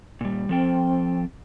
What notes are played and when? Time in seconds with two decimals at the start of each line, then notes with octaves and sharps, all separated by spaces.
0.21 A#2 G3
0.49 F3 C4 A4 G5